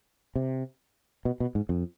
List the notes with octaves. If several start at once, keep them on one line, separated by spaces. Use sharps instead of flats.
C3
B2
B2
G#2
F2